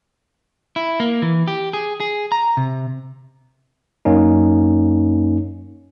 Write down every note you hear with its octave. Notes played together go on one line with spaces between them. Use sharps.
E4
A#3
E3
G4
G#4
G#4
A#5
C3
F#2 A#3 C#4 D#4